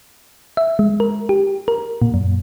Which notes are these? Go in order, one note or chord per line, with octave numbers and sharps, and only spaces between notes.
E5
G#3
A#4
G4
A#4
A#2
F#2